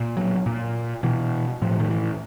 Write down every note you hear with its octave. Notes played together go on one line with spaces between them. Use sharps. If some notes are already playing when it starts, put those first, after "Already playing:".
Already playing: A#2
F#3
A#2
B2 E3
A2 F3
D#3
E3